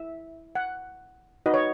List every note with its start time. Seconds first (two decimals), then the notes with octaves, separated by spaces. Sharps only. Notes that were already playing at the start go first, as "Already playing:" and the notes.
Already playing: E4 E5
0.55 F#5
1.46 D#4 F#4 B4 D#5
1.54 C#5